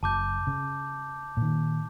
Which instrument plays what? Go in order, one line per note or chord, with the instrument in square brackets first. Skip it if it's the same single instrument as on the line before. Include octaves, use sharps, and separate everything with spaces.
[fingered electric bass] F#1 [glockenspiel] A5 D6 G6
[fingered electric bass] C#3
A#2 D#3